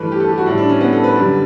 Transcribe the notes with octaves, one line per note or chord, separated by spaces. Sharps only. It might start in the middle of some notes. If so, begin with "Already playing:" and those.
Already playing: G2 E3 A3 B4
G4
A4
G4
F#4
A2 G3 E4
D4
C#4
B3
A4
B4
F#2 D3 G3